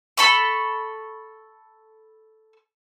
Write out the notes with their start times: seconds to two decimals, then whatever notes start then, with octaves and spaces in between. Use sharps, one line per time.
0.17 A4 B5 C#6